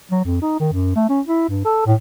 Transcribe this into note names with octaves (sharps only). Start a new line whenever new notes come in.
F#3
F2
D#4
D#3
F#2
A3
C#4
E4
G2
A4
A2